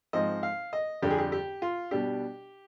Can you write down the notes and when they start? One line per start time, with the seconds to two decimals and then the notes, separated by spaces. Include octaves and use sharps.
0.13 G#2 F3 C4 D#4 D#5
0.43 F5
0.73 D#5
1.02 F2 D3 G3 D4 G4
1.10 G#4
1.18 G4
1.32 G4
1.62 F4
1.91 B2 G3 D4 G4